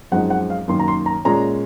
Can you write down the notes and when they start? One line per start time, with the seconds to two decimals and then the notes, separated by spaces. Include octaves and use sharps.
0.12 F#2 F3 G#3 C4 D#4 F#5
0.30 F#5
0.50 F5
0.68 F#2 D#3 A#3 C6
0.79 A#5
0.88 C6
1.06 A#5
1.25 A#2 G#3 C#4 A#5